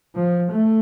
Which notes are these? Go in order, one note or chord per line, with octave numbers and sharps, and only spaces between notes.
F3
A3